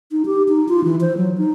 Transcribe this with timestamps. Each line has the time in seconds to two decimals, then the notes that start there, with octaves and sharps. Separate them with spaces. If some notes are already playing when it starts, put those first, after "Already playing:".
0.12 D#4
0.26 G4
0.49 D#4
0.68 F4
0.84 E3
1.01 C5
1.17 F#3
1.38 D#4